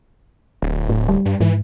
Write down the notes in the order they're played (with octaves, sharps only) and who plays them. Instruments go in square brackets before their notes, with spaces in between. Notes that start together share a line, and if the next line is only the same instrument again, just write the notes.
[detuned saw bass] D1
[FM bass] A2
G3
[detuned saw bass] G2
[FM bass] G#2 [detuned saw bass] E3